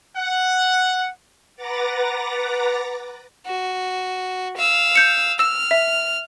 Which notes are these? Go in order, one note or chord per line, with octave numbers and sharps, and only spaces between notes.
F#5
B4 F#5 A#5 D6 A6 A#6
F#4
F5 E6
G6 C#7
E6 F6 E7
E5